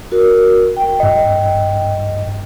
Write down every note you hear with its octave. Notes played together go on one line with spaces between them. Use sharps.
F#4 A#4
G5
G2 D#5